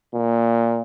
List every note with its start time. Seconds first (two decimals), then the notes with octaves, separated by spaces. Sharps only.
0.14 A#2